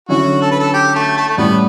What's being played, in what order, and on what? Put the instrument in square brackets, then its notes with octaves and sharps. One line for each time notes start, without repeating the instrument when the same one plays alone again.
[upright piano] D3 F#3 C#4 E4 [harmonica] F#4
[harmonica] A4
B4
A4
G4
A3
A3
A3
[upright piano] A2 G3 C#4 E4 [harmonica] B3